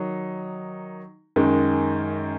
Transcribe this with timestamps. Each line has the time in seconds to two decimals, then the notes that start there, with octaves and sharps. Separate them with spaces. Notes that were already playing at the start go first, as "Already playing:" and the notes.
Already playing: D#3 F#3 D#4
1.36 F#2 D#3 G#3